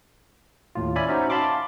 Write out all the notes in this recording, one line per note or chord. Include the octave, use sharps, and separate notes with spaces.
D#2 A2 F4
C#4 D5 E5 G#5 B5
C#4 D#4 F#4 C5 E5
F5 A5 B5 C6 D6